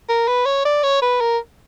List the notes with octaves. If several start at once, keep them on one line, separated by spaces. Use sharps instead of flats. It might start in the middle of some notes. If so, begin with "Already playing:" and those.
A#4
B4
C#5
D5
C#5
B4
A#4